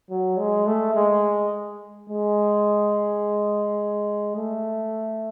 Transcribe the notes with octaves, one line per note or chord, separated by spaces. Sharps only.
F#3
G#3
A3
G#3
G#3
A3